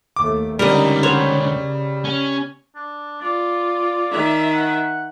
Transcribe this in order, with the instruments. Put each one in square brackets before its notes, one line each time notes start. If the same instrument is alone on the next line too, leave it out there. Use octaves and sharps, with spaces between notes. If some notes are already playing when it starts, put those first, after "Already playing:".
[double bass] D#2 A3 [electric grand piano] D6
[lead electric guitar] C#2 D3 [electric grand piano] G3 [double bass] C#4 D#4 [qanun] A#4 D#5
[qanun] C5 C#5 F#5
[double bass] C#3
[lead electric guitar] C#4
[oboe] D4
[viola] F4 [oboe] D5
[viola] D#3 E5
[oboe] F#5